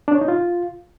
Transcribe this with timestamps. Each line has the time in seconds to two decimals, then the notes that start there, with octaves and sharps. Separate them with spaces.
0.08 D4
0.15 C#5
0.21 D#4
0.28 F4